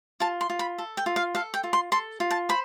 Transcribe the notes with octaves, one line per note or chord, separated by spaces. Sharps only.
F4 A5
C6
F4
B5
A4
G5
F4
F5
A4 F5
G5
F4
C6
A4 C6
F4
A5
C5 B5